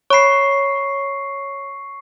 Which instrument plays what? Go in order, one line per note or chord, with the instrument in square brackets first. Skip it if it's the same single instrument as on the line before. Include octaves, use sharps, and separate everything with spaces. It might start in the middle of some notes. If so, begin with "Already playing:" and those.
[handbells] C#5 B5 [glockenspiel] C#6 C7